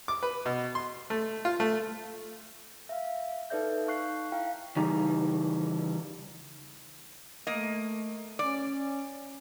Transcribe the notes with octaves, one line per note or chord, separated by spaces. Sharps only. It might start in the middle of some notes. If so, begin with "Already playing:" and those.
D6
B4
B2
C6
A3
F4
A3
E5 F5
D#4 A4 B4 D5 E5 G6
D#4 F5 C#6 F#6 C7
E4 F5 G5
C#3 E3 G3 D#4
A3 A#3 D#5
C#4 D5